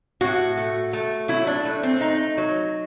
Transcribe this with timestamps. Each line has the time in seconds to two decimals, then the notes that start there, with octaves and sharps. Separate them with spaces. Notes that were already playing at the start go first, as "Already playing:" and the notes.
0.21 A2 F#4
0.57 A3
0.93 A3
1.28 F#3 E4
1.47 D4
1.65 A3
1.83 C4
2.00 A3 D#4
2.37 F#3